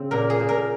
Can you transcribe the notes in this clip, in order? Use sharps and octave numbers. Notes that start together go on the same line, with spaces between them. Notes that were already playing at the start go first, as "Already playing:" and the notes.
Already playing: C#3 C4
A#2 A#4
G#4
A#2
A#4